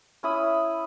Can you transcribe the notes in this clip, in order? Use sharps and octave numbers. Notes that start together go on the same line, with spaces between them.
C#4 E4 B5 D#6